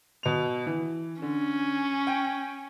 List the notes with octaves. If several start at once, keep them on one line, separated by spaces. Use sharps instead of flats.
B2 F7
E3
D3 C#4
G5